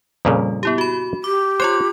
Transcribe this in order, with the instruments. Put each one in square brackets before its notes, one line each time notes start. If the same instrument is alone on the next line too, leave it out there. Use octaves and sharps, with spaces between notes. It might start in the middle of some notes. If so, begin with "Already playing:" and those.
[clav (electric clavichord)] F2 A#2 C#3 [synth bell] G3
[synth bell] B3 E4 G4
F#4 B5
[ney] G4 [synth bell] D6
[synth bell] F4 C6 F#6 [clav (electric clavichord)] C5 C#5